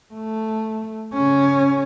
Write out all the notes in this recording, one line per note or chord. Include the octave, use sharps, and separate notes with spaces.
A3
C#3 C#4